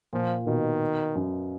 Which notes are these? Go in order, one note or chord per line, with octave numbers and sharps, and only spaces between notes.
A#2 F3
B2 D#3
F#2